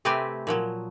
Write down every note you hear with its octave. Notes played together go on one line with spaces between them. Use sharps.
C3 A3 C4 G4 B4 G#5
A#2 F3 F#3